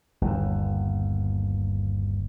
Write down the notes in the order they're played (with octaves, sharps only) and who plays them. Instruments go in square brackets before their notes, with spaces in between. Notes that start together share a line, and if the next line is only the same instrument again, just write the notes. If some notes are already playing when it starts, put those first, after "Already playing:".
[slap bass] G1 D#2